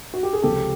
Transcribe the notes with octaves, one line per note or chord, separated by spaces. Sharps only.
F#4
G4
G#4
C#2 C3 F3 G4 A4